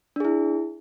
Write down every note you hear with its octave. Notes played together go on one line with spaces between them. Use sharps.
D4 E4 G#4